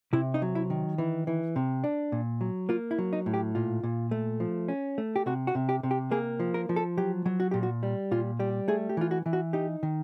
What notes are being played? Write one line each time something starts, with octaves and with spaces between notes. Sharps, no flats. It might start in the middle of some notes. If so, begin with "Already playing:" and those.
C3 E4
D#4
F#3
E4
D#3
E3
E3
C3
D4
A#2
F#3
A#3 F4
E4
F#3
D#4
A2
G4
A#2 F4
A#2
A3
F3
C#4
A3
G4
C3 F#4
F#4
C3
G4
C3
G4
A#3 G#4
F3
A#4
F3
A4
F#3 G4
F#3
F#4
A#2 G4
F#4
G3
A#2 F4
G3 G4
A3 G#4
G4
E3 F4
F#4
E3
F#4
D#4 G4
D#3